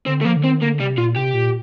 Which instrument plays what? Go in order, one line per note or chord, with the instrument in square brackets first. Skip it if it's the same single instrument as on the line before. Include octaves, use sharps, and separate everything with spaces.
[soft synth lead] D3 [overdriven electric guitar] C4
[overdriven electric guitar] A3
[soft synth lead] F3 [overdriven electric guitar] A#3
[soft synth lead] D3
[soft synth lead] D#3 [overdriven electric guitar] C4
[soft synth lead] D3 [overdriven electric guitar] A#3
[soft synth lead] C3 [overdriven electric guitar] G3
[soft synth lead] A#2 [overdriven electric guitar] F4
[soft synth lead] C3 [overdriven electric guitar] G4
[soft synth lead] A#2